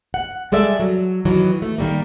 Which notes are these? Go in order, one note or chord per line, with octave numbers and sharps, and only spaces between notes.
F#5
G3 G#3 A4 D5 E5
F#3
D#3 E3 F#3
A3
D#3 G3 A#3